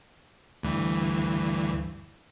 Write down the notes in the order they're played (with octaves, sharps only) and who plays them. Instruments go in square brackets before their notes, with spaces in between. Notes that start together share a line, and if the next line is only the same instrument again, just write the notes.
[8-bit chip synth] D2 G2 E3